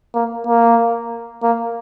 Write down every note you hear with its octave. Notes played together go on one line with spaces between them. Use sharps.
A#3
A#3
A#3